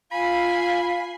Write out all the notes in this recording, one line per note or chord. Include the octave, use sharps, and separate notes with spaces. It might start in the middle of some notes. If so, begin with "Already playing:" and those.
F4 F5 G#5 B5 C7